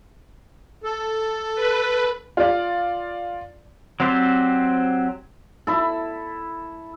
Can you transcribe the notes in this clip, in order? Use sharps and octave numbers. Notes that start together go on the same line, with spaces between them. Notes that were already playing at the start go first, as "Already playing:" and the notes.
A4
B4
F4 D5
F#3 C4 G4 C5 D5
E4 A4